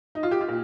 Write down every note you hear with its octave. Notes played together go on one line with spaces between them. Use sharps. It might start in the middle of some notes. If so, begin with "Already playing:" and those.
D#4
F4
G4
F4
A#2